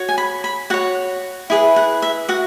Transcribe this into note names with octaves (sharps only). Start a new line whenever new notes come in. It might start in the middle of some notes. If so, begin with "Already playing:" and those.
Already playing: F#4 C#5
G#5
B5
B5
F#4 C#5 F#5
E4 G#4 B4
F#5
E5
F#4 F#5